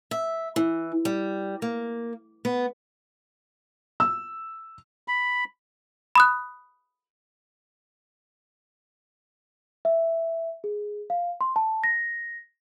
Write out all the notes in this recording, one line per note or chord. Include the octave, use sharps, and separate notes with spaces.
E5
E3
G3
A#3
B3
E6
B5
B5 D#6 F#6
E5
G#4
F5
C6
A5
A#6